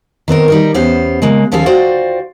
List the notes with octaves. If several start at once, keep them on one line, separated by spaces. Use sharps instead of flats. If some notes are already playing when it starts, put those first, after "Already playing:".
D#3 B3 C4 A#4
G3 D#4 A#4
E2 B3 C#4 G4 C5
C#3 G#3 A#3
D#2 F3 C#4 G#4 A4 F5
F4 F#4 C5 D5 G5